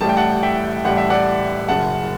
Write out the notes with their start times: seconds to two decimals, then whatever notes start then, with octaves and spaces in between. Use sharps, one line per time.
0.01 A1 A2 G3 A5
0.09 G5
0.17 F#5 A5
0.43 E5 G5
0.85 A1 A2 G3 F#5
0.97 E5
1.10 D5 F#5
1.69 F#1 F#2 C#3 F#5 A5